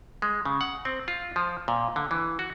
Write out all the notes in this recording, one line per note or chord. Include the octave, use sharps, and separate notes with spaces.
G#3
C#3
F#5
C4
F4
F3
A#2
D3
E3
F#4